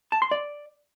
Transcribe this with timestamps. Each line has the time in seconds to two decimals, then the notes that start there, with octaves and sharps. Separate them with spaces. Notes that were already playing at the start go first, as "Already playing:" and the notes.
0.12 A5
0.22 C6
0.31 D5